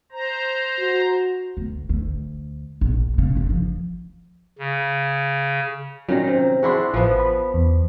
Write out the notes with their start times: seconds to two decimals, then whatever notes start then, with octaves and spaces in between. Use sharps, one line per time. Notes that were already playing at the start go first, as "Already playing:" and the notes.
0.12 C5 A#5
0.79 F#4
1.57 D2
1.89 D2
2.81 A#1
3.18 C#3
3.37 F#1
3.50 F3
4.59 C#3
6.09 A#2 D#3 F#3 C#4 A#6
6.27 C3
6.63 D4 E4 F#4 G#4 C6
6.94 A1 F3 B3
7.20 B5
7.54 E2